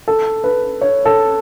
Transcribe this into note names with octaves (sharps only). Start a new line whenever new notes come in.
A4
B4
C#5
A4